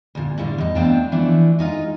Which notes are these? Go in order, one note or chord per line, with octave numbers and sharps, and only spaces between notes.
D2 A#2
A2 D3 G3 F5
E2 D#4
A3 B3 C4 D4 F5 G5
E3 F3 A3 D4 E4
G#3 D#4 F4